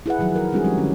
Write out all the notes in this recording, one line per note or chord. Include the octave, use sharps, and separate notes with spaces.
E4 G#4 B4 F#5
D#3 F3 F#3 G#4
A#4
G3 G#3 C4 D4 F#4 G#4
F3 G#3 C#4 G4
D3 C#4